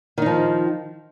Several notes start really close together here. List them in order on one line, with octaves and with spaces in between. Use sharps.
D#3 D#4 F3